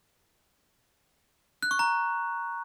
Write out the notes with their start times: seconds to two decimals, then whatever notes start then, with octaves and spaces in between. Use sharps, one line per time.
1.63 F#6
1.71 C#6
1.79 A#5